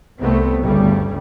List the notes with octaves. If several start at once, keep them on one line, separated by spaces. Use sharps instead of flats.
C2 A3 B3 C4
G1 D2 G2 C#3 G3